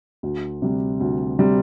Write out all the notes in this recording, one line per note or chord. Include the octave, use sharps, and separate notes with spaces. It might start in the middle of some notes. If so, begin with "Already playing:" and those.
D2
C3 G3
D2
C3 G3